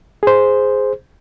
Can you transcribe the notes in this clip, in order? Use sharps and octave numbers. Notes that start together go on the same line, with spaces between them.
G#4 C5